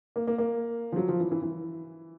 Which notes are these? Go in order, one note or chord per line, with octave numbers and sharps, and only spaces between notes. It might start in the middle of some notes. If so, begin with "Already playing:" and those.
A#3
A#3
A#3
F3
F#3
F3
E3
E3
E3